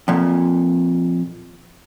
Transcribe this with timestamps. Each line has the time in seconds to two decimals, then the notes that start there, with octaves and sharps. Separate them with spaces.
0.08 F2 A#2